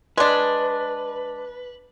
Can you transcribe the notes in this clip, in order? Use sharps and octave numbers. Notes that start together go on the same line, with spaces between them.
G#3 D4 B4